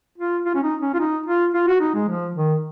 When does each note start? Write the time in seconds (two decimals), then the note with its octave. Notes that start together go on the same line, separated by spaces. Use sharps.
0.18 F4
0.45 F4
0.55 C#4
0.63 D#4
0.81 C#4
0.94 F4
0.99 D#4
1.26 F4
1.54 F4
1.67 F#4
1.80 D#4
1.95 G#3
2.08 F3
2.35 D#3